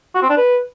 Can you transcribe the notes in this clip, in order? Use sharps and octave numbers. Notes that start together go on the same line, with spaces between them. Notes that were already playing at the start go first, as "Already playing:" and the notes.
F#4
C4
D4
B4